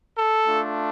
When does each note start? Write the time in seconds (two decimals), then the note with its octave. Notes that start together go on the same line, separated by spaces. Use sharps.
0.17 A4
0.48 A3 D4 F4